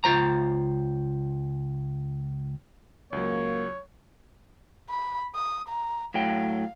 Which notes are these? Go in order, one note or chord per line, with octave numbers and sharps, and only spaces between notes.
C#2 F4 C5 A#5
C#2 F#3 A#3 C#5
B5
D#6
A#5
A2 F#3 F5 G5